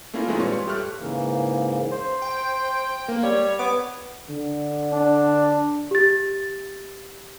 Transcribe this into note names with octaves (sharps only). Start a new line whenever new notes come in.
A3 A#3 C#4 E4 F4 A#4
E3 G#3 A3 C4 D#4 F4
A#2 G3 B4 C#5 C#6
C6
G4 A4 E5 C#6 F6 F#6
G#2 C#3 E3 A#3
C5
G5
A#3
G3 C#5
B3 D6
D3
D4
G4 A6